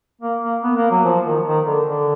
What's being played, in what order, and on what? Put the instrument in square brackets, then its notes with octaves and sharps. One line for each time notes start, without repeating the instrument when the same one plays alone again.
[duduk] A#3
A#3
B3
A#3
F#3
F3
D#3
D#3
D3
D3